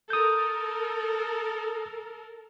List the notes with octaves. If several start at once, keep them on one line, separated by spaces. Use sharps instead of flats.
A4 A#4 D#6 G6